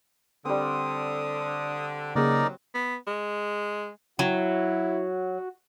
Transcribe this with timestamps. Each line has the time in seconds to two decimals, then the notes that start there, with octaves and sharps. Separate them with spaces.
0.45 D3 G3 C4 D#6
2.16 C#3 F#3 A#3 D#4 G#4 A#4 D5
2.74 B3
3.07 G#3
4.19 F#3 E4 F#4